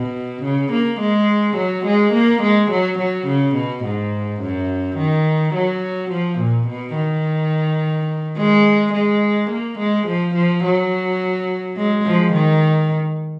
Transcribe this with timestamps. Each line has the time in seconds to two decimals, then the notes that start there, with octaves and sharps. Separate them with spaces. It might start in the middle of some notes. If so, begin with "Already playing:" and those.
Already playing: B2
0.44 C#3
0.73 A#3
1.00 G#3
1.57 F#3
1.86 G#3
2.13 A#3
2.42 G#3
2.71 F#3
2.99 F#3
3.27 C#3
3.56 B2
3.84 G#2
4.41 F#2
4.97 D#3
5.54 F#3
6.11 F3
6.39 A#2
6.67 B2
6.95 D#3
8.37 G#3
8.94 G#3
9.51 A#3
9.79 G#3
10.07 F3
10.35 F3
10.64 F#3
11.77 G#3
12.06 F3
12.34 D#3